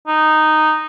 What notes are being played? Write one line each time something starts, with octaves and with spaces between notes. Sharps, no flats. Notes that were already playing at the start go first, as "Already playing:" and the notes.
D#4